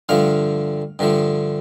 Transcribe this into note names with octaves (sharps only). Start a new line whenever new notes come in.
G2 D3 F3 A3 F5
G2 D3 F3 A3